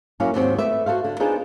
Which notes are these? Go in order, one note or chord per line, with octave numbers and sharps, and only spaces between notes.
F#3 A#3 C#4 E4 F5
D#2 G#2 F#3 C4 F#5
A3 B4 D5 E5
F#4 A4 C5 F5
D3
B3 D4 D#4 F4 G#4 C5